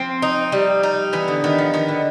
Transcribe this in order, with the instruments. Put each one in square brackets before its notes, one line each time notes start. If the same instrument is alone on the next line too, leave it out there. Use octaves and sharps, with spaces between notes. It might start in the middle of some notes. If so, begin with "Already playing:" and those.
Already playing: [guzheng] F3 [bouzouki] C4
[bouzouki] D#4
G3
D#4
[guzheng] E3 [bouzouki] B3
[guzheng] D3
[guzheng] D#3 [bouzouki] B3
[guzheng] F3
[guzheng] D#3 [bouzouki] B3
[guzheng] D3